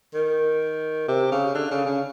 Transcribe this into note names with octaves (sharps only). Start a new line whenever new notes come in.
D#3
C3
C#3
D3
C#3
C#3